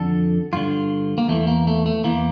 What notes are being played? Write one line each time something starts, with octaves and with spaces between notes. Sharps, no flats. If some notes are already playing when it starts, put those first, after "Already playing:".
Already playing: F2 D3 A4
G2 D3 F4
A#3
E2 E3 A3
A#3
A3
A3
E2 E3 A#3